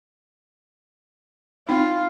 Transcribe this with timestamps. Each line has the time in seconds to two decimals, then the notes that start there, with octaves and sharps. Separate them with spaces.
1.69 C4 D#4 F4